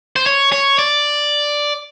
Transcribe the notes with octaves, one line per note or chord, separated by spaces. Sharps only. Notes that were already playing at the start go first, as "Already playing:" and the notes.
C5
C#5
C#5
D5